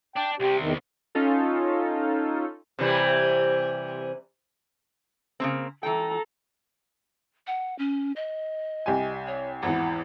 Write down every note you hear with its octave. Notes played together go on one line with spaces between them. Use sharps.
D4 G5
C2 C3 G4
E2 D#3
C#4 D#4 F4 A4
C3 E3 G3
C#3 A#3 C4
E3 A4 G5 A#5
F#5
C#4
D#5
C2 G4 G#5
C#5
G#1 E2 E3 F#5